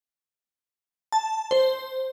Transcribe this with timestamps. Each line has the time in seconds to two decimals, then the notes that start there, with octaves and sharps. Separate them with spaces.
1.12 A5
1.51 C5